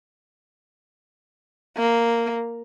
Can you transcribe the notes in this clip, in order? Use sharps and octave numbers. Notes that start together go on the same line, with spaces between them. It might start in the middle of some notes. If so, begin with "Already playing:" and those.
A#3